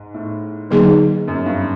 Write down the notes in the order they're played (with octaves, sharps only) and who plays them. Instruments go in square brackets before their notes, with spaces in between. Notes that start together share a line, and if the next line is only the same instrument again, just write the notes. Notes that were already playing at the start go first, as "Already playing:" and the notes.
Already playing: [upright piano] G#2
A2
[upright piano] G#2 [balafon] D3 F#3 A#3 D#4 G#4
[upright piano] F#2
G2